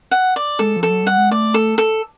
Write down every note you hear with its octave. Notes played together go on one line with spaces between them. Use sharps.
F#5
D5
G#3 A4
F3
A4
F#3
G3 F#5
G#3
A3 D5
A4
A4